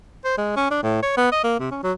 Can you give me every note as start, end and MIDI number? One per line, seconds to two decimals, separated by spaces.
0.25 0.37 72
0.38 0.55 56
0.57 0.66 61
0.71 0.80 62
0.83 1.02 45
1.03 1.16 73
1.17 1.28 59
1.32 1.43 75
1.44 1.56 58
1.60 1.71 48
1.71 1.79 61
1.83 1.92 54